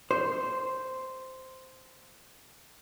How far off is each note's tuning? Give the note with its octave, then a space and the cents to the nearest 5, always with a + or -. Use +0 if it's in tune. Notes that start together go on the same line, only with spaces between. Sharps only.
C5 -5